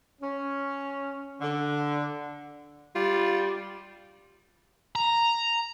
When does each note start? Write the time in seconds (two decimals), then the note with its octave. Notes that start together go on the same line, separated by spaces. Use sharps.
0.22 C#4
1.41 D3
2.95 G3 F4
4.96 A#5